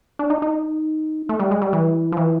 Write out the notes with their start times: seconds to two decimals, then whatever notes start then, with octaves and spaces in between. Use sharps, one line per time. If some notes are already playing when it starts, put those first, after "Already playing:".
0.19 D4
0.30 D#4
0.42 D#4
1.29 A3
1.40 G3
1.51 G#3
1.62 G3
1.73 E3
2.12 F3
2.17 E3